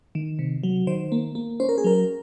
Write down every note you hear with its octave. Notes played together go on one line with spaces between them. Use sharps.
D#3
C3
F#3
D#3 C5
A#3
A#3
C#4 C5
A#4
G#4
F#3 A#4